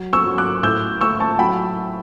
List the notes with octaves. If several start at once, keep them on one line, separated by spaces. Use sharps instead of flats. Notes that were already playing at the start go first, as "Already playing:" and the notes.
Already playing: F#3
C#6 E6
F#3
D6 F#6
A2 E6 G6
A3 C#6 E6
A5 C#6
F#3 G5 B5